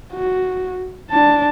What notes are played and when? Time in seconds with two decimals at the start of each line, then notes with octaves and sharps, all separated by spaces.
0.13 F#4
1.11 D4 A5